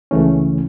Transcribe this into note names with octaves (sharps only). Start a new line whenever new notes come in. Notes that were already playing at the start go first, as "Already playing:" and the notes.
C#2 C#3 E3 A3 C#4